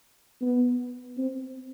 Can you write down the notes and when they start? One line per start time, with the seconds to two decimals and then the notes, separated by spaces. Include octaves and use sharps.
0.41 B3
1.18 C4